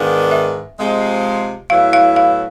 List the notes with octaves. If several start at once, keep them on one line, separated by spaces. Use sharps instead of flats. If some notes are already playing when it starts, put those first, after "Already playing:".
Already playing: G#2 D#3 G#3 B3 D4 F5
E5
C3 F3 G#3
A2 F#3 B3 E4 F5
F5
F5